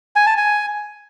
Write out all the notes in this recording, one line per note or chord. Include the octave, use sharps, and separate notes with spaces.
G#5
A5
G#5